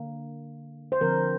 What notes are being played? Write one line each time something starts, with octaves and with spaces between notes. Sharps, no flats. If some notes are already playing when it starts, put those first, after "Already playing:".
Already playing: D3 A#3
C5
D3 F3 C4 A#4